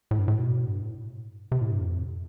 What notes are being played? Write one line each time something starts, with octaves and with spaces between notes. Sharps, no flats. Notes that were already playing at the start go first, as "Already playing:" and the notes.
A2
G2
A2
B2
G2
A2
C3
A2
G2
F2